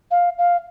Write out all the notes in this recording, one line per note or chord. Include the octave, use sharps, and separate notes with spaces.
F5
F5